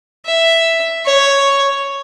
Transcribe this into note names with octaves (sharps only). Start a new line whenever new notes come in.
E5
C#5